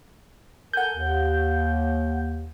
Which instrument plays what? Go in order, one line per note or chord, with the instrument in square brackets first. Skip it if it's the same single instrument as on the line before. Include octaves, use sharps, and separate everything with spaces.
[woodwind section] A4 A#4 G#5 [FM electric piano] F#5 G6
[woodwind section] D#2